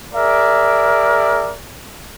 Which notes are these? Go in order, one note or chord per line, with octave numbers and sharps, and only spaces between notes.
G#4 A#4 D5 E5